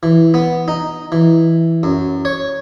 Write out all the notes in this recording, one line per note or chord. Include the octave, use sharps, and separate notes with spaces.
E3
B3
D#4
E3
F#2
C#5